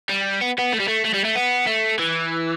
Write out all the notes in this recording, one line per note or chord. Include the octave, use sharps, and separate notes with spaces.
G3
B3
B3
A3
G3
A3
A3
G3
A3
B3
A3
E3